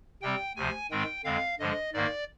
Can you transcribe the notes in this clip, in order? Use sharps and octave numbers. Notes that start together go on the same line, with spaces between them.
C3 G3 C4 G5
D2 C3 F3 G#5
G#2 D#3 G#3 C4 G5
F2 D3 G#3 C4 F5
G2 D3 F3 G#3 D#5
G#2 D#3 A#3 D5